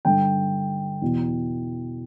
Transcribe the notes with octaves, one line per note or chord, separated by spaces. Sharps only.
G2 D3 G5
E2 B2